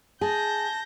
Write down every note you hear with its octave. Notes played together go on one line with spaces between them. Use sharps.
G#4 A5 G6 A#6